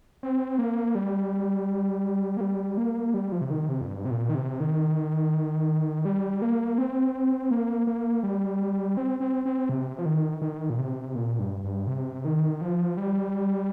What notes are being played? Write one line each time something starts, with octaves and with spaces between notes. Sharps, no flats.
C4
A#3
G3
A#3
G3
A#3
G3
F3
C3
D#3
C3
F2
G2
C3
A#2
D#3
C3
D#3
G3
A#3
C4
A#3
A#3
G3
C4
C4
C4
C3
F3
D#3
D#3
A#2
C3
A#2
G2
G2
C3
D#3
F3
G3